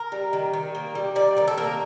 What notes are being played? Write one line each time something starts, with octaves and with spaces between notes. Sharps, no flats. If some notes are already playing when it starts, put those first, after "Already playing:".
Already playing: A#4
G3
D#3
D#3
A#3
G3
D#3 D5
D#3 D5
A4
A#3 A#4